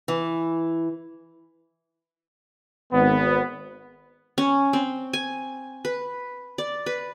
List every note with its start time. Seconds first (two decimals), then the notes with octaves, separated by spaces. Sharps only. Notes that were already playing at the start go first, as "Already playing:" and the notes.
0.08 E3
2.93 G#1 B3
4.38 C#4
4.73 C4
5.13 G#5
5.85 B4
6.58 D5
6.86 B4